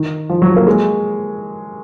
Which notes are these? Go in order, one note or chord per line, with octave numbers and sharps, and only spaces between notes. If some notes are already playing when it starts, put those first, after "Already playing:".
Already playing: D#3
F3
F#3
A#3
G#3